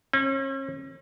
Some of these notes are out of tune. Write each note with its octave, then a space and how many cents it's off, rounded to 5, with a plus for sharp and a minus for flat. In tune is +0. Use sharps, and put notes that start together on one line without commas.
C#4 -40